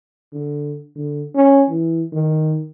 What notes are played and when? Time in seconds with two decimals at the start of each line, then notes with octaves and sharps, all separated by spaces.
0.33 D3
0.96 D3
1.35 C#4
1.69 E3
2.12 D#3